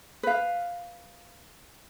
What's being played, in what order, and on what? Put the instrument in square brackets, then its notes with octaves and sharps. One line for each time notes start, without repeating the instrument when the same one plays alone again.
[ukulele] B4 F5